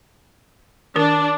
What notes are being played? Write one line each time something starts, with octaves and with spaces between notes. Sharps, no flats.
D#3 D4 A#4